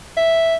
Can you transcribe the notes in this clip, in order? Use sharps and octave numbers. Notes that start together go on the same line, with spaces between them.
E5